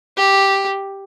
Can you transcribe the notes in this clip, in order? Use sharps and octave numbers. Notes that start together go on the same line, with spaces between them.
G4